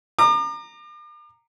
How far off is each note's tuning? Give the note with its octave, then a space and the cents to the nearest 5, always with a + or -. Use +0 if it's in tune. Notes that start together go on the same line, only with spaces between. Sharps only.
A#5 -10 D6 +40